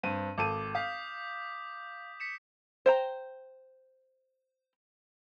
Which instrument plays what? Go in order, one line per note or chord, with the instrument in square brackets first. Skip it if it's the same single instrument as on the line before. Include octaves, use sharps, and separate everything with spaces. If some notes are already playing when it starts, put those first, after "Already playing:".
[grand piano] G2 C4 D#7
[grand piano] G#1 A4 D#7 [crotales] D6
[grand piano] F5 [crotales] D#6 G6 B6
[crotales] B6 C#7 E7
[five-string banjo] C5 G5 A#5